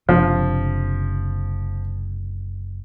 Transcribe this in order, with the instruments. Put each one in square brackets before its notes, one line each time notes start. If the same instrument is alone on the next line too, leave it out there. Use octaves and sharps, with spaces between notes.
[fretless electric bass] F#1 C3 D4 [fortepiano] F3